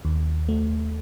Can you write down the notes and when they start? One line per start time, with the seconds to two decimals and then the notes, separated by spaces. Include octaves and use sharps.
0.05 D#2
0.49 A3